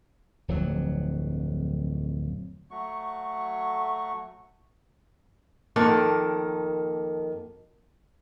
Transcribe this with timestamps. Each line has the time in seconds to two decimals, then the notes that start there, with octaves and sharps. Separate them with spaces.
0.48 D1 F2 F#3
2.71 F#3 A3 C#6
5.76 F2 D#3 A#3 F#5 A5